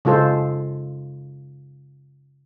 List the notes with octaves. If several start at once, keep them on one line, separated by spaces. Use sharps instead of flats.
C#3 G#3 F4 A4 C5